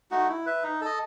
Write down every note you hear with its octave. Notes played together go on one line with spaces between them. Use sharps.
A3 D#4 F#4
E4
B4 E5
D#4
A4 D#5